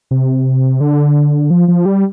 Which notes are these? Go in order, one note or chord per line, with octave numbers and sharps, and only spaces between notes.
C3
D3
F3
F3
G3